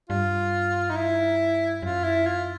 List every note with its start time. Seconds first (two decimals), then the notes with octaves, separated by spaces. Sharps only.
0.09 G2 F4
0.90 D#4
0.96 E4
1.82 F#2 F4
2.04 E4
2.27 F4